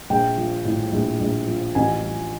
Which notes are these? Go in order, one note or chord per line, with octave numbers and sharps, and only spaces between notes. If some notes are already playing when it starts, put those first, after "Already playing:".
A#1 G5
F3
A2
A#1
A#1
F3
A1 G#5
F3